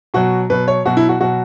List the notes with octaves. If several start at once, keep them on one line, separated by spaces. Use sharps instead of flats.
B2 F#3 F#4
B2 F#3 B4
C#5
B2 F#3 F#4
E4
F#4
B2 F#3 F#4